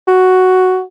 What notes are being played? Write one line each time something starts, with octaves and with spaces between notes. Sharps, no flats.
F#4